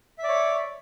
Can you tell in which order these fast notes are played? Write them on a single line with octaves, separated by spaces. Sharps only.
E5 D5 C#5